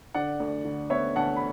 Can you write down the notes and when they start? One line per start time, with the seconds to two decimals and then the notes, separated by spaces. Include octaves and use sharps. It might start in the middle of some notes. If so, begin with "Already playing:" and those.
0.14 D3 D5 F#5
0.40 D2
0.65 D3
0.90 B3 C#5 E5
1.16 D2 F#5 A5
1.36 B5